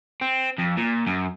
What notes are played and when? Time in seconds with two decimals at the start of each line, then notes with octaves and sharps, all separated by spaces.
0.22 C4
0.59 F2
0.78 A#2
1.07 F#2